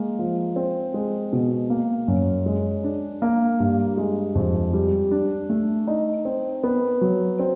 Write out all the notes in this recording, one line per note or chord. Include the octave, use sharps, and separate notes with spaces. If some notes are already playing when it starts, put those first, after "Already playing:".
Already playing: G#3 A#3
F3
C4
G#3
B2
A#3
F#2
G#3
D4
A#3
G2
G#3
F2
G3
D4
A3
D#4
C4
B3
F#3
C4